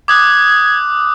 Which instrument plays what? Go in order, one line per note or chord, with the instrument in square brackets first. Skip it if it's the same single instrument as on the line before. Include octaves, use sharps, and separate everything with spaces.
[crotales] D6 D#6 F#6 [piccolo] G#6